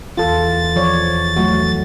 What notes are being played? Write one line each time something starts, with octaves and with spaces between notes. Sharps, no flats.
E2 F4 A4 A6
F3 C#5 D5
F#3 A3 F#4